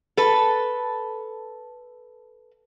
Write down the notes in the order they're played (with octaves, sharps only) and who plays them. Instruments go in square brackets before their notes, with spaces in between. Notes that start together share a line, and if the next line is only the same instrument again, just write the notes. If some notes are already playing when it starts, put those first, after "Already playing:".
[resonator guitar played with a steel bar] A4 B4